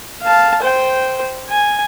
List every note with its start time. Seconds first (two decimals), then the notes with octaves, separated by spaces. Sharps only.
0.22 F5 A5
0.62 C5 G5
1.49 G#5